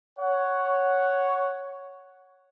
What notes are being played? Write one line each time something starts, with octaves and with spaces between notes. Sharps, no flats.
C#5 F#5